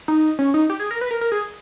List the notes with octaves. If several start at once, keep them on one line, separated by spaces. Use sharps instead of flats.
D#4
C#4
D#4
G4
G#4
A#4
B4
A#4
A#4
G#4